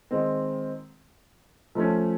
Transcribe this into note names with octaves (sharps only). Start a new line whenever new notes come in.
D#3 G#3 C4
F3 A3 C#4